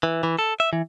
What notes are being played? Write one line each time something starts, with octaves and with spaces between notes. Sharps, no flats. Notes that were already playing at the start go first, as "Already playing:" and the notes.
E3
E3
A4
E5
E3